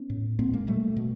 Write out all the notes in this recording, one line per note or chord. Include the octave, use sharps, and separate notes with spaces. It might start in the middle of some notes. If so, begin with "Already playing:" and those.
Already playing: B3 C#4
A2
A#2 A#3 C4
G#3 A#3
B2 G3 A3
B2